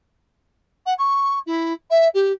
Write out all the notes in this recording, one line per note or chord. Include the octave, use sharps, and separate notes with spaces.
F#5
C#6
E4
E5
G4